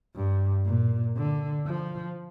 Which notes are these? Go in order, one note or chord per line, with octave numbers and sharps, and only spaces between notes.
G2
A#2
D3
F3